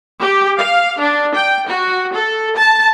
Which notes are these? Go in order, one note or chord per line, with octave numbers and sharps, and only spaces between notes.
G4
F5
D4
G5
F#4
A4
A5